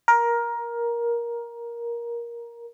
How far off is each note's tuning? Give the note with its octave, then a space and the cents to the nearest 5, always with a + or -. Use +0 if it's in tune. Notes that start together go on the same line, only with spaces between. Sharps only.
A#4 +15